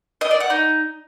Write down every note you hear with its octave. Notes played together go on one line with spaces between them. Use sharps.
D#5
D5
F#5
D#4